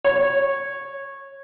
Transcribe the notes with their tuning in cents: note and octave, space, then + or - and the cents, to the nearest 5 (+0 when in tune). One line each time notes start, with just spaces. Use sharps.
C#5 -20